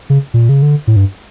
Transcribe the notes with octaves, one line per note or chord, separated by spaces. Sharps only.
C#3
A#2
C#3
D3
A2
G2